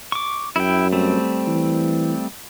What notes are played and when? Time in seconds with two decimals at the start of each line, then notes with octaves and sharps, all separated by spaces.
0.12 C#6 D6
0.56 F#2 E4 G5
0.92 G3 A3 C4
1.47 E3